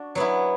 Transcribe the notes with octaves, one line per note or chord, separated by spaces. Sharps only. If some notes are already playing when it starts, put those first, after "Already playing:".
Already playing: D4 F#4
F#3 B3 E4